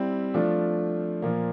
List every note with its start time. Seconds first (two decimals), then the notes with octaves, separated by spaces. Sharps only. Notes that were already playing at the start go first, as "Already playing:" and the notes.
Already playing: G3 C4 E4
0.34 F3 A3 D4 F4
1.22 A#2 F3 A#3